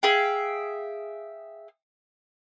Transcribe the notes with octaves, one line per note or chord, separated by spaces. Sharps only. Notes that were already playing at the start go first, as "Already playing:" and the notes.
G#4 E5 F5 G5